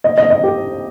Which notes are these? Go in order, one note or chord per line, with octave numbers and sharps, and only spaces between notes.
D#5
D#5
D#5
G4